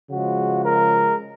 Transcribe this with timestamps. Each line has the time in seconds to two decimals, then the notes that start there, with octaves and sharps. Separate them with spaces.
0.11 C#3 F3 G#3 F#4
0.65 A#4